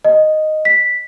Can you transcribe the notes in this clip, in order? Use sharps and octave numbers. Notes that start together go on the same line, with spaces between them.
D#5
B6